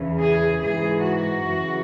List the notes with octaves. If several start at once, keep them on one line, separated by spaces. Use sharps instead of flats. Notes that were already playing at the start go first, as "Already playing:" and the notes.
Already playing: E2 C#3 E3
G#4
G#2 E3 G#4
F#4
F#2 C#3 E3